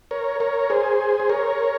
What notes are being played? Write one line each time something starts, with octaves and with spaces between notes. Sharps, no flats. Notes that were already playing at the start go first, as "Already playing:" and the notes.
A#4 C#5
A#4 C#5
G#4 C5
C5
A#4 C#5